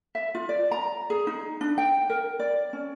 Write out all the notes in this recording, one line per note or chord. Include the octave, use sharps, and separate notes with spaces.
E5
F4
D5
A#5
G#4
D#4
D4
G5
A#4
D5
C#4